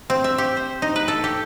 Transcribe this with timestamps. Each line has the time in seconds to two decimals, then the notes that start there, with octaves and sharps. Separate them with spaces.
0.10 C4
0.24 E5
0.38 G4
0.57 C5
0.82 D#4
0.96 B4
1.08 A4
1.24 G4